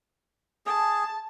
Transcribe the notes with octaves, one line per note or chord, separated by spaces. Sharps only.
G#4 A5